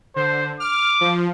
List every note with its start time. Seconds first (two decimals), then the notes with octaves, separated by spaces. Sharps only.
0.16 D3 C5
0.60 D6 F6
1.01 F3